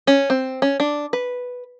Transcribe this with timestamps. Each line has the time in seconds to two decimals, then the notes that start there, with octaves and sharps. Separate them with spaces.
0.07 C#4
0.30 C4
0.62 C#4
0.80 D4
1.13 B4